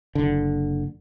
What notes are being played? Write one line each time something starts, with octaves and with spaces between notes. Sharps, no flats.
F#1 D3